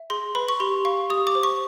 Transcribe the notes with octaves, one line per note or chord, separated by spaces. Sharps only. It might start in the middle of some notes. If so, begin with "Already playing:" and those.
Already playing: E5
G#4 C6
B4 B5
C#6
G4 C6
F5 C#6
G4 D#6
D6
C5
C#6